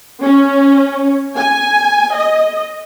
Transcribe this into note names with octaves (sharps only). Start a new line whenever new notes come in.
C#4
G#5
D#5